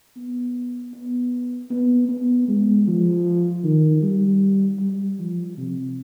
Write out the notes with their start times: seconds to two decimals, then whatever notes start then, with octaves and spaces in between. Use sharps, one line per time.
0.16 B3
0.94 B3
1.70 B3
2.09 B3
2.48 G#3
2.87 F3
3.64 D#3
4.02 G3
4.79 G3
5.19 F3
5.57 C3